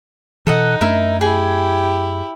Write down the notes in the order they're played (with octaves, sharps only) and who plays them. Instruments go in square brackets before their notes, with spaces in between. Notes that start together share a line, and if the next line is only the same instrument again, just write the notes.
[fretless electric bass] B2 E3 [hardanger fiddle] D#4 [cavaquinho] A4 D#5 F#5
[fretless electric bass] F#2 A3 D4 [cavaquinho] E4 A#4 E5
[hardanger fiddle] E4 G4 [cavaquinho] G#4 G#5